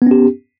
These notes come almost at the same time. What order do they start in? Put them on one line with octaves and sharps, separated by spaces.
B3 C#4 G4